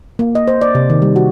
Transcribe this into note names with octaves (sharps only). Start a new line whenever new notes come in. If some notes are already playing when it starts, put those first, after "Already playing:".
A#3
D#5
C5
D5
C3
D#3
G3
F#4